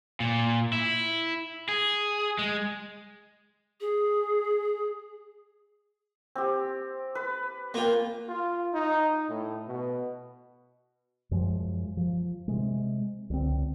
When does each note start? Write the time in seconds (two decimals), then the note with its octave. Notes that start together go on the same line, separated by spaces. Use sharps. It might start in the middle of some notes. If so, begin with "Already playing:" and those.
0.20 A#2
0.73 E4
1.69 G#4
2.39 G#3
3.81 G#4
6.35 C4 G4
7.15 B4
7.74 A#3 F4 G5 C6
8.29 F4
8.74 D#4
9.29 A2
9.68 B2
11.31 F#2 F3 G#3
11.97 F3
12.48 C3 G#3
13.30 C#2 D3 F#3 C4